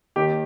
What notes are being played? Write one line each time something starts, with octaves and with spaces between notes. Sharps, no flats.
D#2 D#3 G4